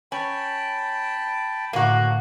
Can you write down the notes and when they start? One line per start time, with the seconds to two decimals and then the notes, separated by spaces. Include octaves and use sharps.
0.12 C#4 G5 A5 B5
1.73 A2 D3 A#3 F#4